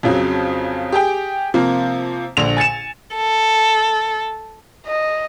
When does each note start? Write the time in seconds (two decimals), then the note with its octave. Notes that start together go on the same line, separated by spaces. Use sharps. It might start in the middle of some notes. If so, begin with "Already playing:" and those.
0.03 F2 C#3 F3 F#3
0.92 G4 G#4 G5
1.54 C3 F3 A#3
2.37 A#1 D3 F7
2.57 G#5 A6 C#7 E7
3.15 A4
4.87 D#5